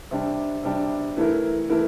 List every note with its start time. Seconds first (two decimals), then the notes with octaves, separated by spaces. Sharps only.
0.11 C3 G3 D4
0.63 C3 G3 D4
1.16 E3 A3 E4 A#4
1.70 E3 A3 E4 A#4